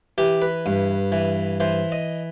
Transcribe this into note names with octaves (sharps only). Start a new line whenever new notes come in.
E3 G4
B4
G2
E3
E3 C5
D#5